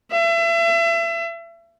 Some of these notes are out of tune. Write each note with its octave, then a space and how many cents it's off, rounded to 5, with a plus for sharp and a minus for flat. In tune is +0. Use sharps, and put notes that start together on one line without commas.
E5 +35